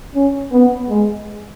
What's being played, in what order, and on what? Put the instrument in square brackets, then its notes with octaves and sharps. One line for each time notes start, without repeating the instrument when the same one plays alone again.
[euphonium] C#4
B3
G#3